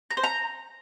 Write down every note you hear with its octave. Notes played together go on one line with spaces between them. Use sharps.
A#5
C5
A#5